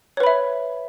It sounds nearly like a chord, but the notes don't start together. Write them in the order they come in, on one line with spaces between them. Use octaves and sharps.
C#5 B4 B5 E5